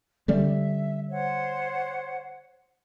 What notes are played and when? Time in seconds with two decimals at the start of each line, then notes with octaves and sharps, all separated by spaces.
0.28 D3 G3 C#4 E5
1.09 C5 C#5 F#5